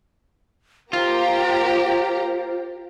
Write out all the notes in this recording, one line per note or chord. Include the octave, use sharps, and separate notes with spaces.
A#3 F4 G4 C5 A#5